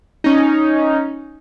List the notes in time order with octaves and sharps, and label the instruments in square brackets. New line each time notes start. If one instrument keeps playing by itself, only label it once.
[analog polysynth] C#4 D#4